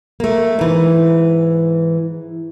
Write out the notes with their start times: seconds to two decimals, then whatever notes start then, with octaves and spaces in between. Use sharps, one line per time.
0.20 A3 A#3
0.59 G#2 E3